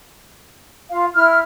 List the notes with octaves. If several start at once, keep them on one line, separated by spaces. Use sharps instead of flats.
F4 F5
E4 F6